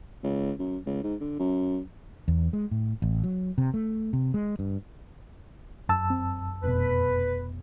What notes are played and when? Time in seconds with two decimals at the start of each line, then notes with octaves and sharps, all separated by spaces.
0.24 C#2
0.59 F#2
0.86 C#2
1.04 G#2
1.21 D3
1.39 F#2
2.28 E2
2.53 G#3
2.71 A2
3.02 A1
3.24 F#3
3.58 C3
3.74 A3
4.13 C3
4.34 G#3
4.59 G2
5.89 F#2 A5 E6
6.10 C4
6.64 F1 B2 B4